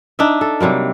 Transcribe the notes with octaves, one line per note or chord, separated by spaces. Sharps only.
D4 D#4 D5 E5
A4
C3 F#3 G3 A#3